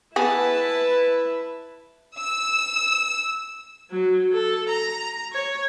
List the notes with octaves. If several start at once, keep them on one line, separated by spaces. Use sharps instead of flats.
B3 E4 G#4 B4 E5 A5
E6
F#3
A4
A#5
C#5